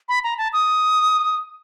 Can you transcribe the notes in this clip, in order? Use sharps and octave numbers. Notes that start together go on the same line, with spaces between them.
B5
A#5
A5
D#6